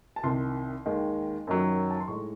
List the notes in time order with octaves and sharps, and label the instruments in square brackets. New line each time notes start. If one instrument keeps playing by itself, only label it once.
[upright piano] A5
C2 C3 D#3 C6
D#2 D#3 G#3
F#2 D#3 F#3
A5
C6
A2 G#3 D#4 C#6